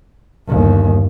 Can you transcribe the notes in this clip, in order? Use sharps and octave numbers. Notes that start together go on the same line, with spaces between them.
G1 D#2